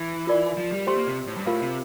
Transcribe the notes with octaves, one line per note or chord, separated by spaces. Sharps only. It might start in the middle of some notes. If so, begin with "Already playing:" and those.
Already playing: E3
F4 A#4 D5
F3
G3
A3 G4 C5 G5 C6
A#3
C3
A2
G2
A2 F4 A#4 F5
C3